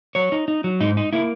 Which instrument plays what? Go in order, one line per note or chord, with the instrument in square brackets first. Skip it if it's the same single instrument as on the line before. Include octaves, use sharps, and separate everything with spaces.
[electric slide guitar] F#3 C#5
D#4
D#4
F#3
G#2 D#4
D#4
A#3 E4